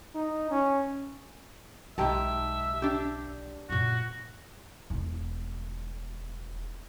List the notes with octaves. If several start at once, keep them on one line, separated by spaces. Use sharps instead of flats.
D#4
C#4
B1 G#2 D#4 G4 E5 A5
D4 G4
F#2 A#2 F#4
E1 E4